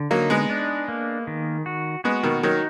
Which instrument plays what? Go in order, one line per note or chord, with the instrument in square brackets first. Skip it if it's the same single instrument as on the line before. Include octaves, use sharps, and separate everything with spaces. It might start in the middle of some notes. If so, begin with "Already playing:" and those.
Already playing: [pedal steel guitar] D3
[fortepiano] F#3 A#3 [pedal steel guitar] D#4
[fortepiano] G#3 B3
[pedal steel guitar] D4
A#3
D#3
F#4
[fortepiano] G#3 B3 [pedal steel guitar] F#4
[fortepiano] B2 D#3
[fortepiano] D#3 F#3 [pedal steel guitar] D#4